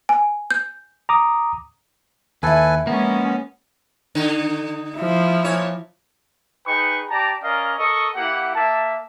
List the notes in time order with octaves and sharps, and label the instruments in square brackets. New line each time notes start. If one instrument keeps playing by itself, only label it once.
[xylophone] G#5
G6
[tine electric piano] A#5 D6 D#6
[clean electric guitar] D#2 [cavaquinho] E4 F4 [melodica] A4 B4 G#5
[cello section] F3 G#3 C#4 [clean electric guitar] A#3 [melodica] B3
[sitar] D3 D#4
[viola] F3 E4
[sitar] A#2 C#5
[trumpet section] D#4 G#4 B4 G5 C#6
G4 D5 A5 A#5
C#4 A#4 D5 D#5 F5
A4 A#4 D#5 C#6
A#3 E4 G4 F#5
A#3 E5 A5